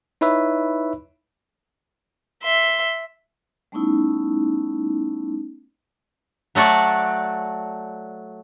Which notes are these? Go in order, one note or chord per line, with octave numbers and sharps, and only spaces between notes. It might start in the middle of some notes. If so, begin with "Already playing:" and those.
D#4 E4 B4 C#5 E5
E5 C6
G3 A3 B3 C#4 D#4 E4
F#3 A3 F#4 D5